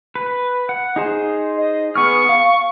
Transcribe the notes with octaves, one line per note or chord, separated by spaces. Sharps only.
B4
F#5
D#4 G#4 C5
D#5
B3 G#4 C#6 F6
F5